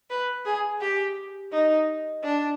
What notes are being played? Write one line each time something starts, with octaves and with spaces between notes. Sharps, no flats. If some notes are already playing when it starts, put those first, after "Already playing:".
B4
G#4
G4
D#4
D4